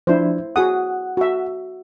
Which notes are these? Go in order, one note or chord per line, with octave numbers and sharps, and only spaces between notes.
F3 D4 E4 C5
F#4 G#4 F#5 D#6
F#4 E5